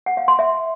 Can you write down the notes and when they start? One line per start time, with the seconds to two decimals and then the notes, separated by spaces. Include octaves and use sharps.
0.06 F#5
0.17 F5
0.28 C6
0.39 E5